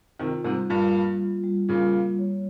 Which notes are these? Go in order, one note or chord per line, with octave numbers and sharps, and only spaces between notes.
C3 D#3 F4
G#2 C3 G3
G2 A#2 G3
A#3
F4
G3
A#2 C#3 G3
A#3
C#5